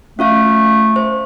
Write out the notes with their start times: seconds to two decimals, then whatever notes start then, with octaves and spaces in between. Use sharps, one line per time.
0.19 A3 C#4 F4 F5
0.96 C5